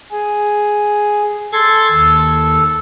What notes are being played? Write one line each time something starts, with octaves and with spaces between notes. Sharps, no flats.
G#4
A4 C6 G#6 A6
D#2